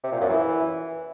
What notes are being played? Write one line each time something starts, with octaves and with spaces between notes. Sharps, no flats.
C3
A#2
F#2
E3